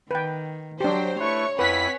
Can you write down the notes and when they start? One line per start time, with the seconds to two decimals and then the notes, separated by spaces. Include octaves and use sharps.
0.11 D#3 B4 G5
0.81 F#3 D4 G4 C5 G5
1.20 A3 E4 B4 C#5 C#6
1.59 F2 E4 B4 F#5 G#5 B6